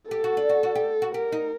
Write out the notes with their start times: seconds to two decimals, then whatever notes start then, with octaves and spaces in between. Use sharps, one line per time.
0.10 G4 A4
0.24 F#4
0.37 D4
0.49 F#4
0.63 F#4
0.75 G4
1.02 F#4
1.14 G4 A#4
1.32 D#4